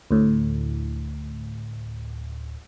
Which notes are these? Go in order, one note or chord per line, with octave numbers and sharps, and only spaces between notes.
D2 A2